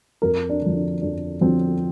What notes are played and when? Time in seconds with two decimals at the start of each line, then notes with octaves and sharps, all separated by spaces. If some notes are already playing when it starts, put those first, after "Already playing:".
0.22 F2 A#4
0.50 D4
0.62 D3 F3
0.75 D4
1.02 F2 D4
1.41 D3 F3 C4